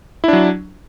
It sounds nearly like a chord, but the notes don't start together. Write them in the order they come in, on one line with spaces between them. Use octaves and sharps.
E4 D4 F#3